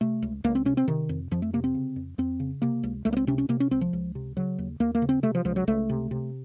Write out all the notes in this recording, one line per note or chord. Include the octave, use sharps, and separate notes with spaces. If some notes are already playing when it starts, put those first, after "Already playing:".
C3 A3
C#2
C#2 A#3
C4
C3 C#4
C4
C3 D#3
F2
F2 F3
A3
C3 A#3
C4
C#3
F2
F2 C4
C#3
C3 A#3
C#2
C#2 A3
A#3
C4
C3 C#4
C#4
C3 A#3
C#4
C#2 C4
F3
C#2
C3
C#3 F#3
D#2
D#2 A#3
A#3
C#3
C4
C3 A3
F3
C#2 F3
F#3
C#2 A3
C3
C3